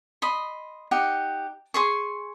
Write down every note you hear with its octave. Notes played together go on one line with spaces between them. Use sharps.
D#5 B5 C6
D#4 G4 F#5
G#4 C6 C#6